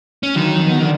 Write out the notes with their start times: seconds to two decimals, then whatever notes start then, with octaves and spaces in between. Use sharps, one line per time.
0.23 C#4
0.36 D3 D#3 F#3
0.54 F2 F#3
0.68 B3
0.81 D3 D4